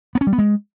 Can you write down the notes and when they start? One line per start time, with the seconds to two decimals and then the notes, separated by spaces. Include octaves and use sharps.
0.15 B3
0.21 C#4
0.27 G3
0.33 B3
0.38 G#3